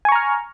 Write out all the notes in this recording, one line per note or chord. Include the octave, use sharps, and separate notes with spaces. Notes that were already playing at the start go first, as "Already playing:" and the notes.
G#5 A#5 C#6 F6